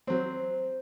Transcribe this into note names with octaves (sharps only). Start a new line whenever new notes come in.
F#3 C4 C5